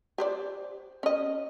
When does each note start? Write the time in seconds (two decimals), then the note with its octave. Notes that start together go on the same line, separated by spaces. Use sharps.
0.18 G4 C5 D5
1.03 C#4 D#5